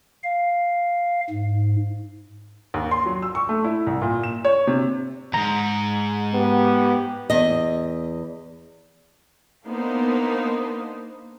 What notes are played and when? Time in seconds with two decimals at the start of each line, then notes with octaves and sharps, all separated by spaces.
0.23 F5
1.30 G#2
2.74 D#2
2.91 C6
3.06 F#3
3.22 E6
3.35 C#6
3.49 A3
3.64 E4
3.87 C2
4.02 A#2
4.24 E7
4.45 C#5
4.67 C3
5.34 E2 G#2 A#5
6.34 B3 G4
7.30 E2 D#5
9.65 A#3 B3 D4 D#4 C5